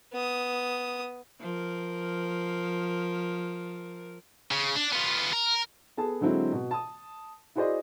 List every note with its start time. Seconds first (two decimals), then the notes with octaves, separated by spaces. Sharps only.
0.13 B3 D#6
1.40 F3 A#4
4.51 C#3
4.76 D4
4.93 B3 F4
5.33 A#4
5.97 B3 G#4 A4 A5
6.21 D3 F#3 G#3 C4 E4
6.52 B2
6.71 A5 D#6
7.55 E4 F#4 G#4 C5 D5 D#5